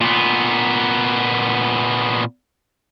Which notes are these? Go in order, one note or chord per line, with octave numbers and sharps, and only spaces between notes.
A#2 B3